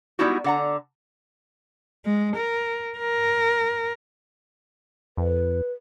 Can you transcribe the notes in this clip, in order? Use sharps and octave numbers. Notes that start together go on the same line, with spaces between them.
G3 G#3 B3 D#4 E4 F#4
D3 F#5 A#5
G#3
A#4
A#4
F2 B4